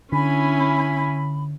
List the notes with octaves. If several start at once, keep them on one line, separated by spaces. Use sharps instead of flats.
D3 C#4 E4 G#5 B5